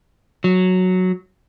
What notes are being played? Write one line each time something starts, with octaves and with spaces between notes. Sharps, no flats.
F#3